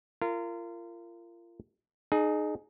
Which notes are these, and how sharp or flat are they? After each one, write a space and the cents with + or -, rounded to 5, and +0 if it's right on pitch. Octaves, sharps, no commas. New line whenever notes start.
F4 -30 A#4 -25
D#4 -25 G#4 +20